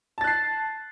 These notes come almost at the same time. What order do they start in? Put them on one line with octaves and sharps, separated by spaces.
A5 A6 F#6 C7